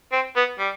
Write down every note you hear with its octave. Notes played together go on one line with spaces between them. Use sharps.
C4
B3
G3